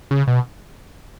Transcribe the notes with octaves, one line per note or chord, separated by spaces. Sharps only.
C#3
B2